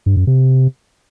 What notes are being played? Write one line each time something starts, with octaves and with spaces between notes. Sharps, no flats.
G2
F#2
C3